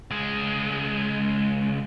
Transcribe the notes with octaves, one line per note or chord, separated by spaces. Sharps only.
C#2 G#3